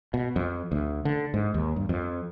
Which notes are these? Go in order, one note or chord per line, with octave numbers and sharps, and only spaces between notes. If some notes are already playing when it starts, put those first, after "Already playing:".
B2
F2
D2
D3
G#2
D#2
G2
F2